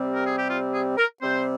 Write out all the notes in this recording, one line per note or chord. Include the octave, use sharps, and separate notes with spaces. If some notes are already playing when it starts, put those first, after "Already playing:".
Already playing: C3 G3 C4
A#4
G#4
G4
F4
G#4
A#4
C3 G3 C4 C5